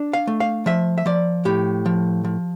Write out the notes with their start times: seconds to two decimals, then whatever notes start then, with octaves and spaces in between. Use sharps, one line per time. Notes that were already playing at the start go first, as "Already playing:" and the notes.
Already playing: D4
0.13 F5
0.27 A3
0.40 F5
0.66 F3 E5
0.98 E5
1.06 F3 D5
1.45 A2 G4
1.86 F3
2.24 F3